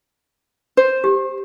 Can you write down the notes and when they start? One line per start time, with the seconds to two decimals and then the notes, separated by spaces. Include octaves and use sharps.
0.77 C5
1.04 G4